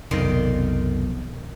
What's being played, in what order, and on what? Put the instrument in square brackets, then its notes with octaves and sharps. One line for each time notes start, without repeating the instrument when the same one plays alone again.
[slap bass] B1 C3 [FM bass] F2 [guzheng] D#3 D5 C6